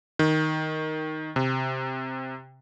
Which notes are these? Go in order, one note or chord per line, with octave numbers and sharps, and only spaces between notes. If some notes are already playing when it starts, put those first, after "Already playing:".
D#3
C3